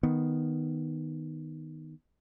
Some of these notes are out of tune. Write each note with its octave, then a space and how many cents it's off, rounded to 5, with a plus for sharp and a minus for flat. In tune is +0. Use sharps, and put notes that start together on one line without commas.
D#3 +0 B3 +0